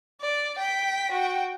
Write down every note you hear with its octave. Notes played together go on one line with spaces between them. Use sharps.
D5
G5 B6
F#4 G5